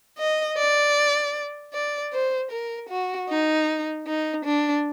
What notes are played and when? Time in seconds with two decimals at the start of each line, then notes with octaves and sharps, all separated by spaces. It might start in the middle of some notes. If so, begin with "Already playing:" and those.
0.19 D#5
0.58 D5
1.74 D5
2.13 C5
2.51 A#4
2.90 F#4
3.29 D#4
4.07 D#4
4.45 D4